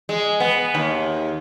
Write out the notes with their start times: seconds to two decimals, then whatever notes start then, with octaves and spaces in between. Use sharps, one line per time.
0.09 G#3
0.40 B3
0.75 D#2